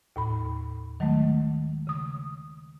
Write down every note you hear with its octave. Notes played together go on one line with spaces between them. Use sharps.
D#2 A2 B5
D#3 F#3 G#3 A3
C#3 D#6